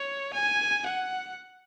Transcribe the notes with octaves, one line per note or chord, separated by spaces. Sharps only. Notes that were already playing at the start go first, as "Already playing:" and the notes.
Already playing: C#5
G#5
F#5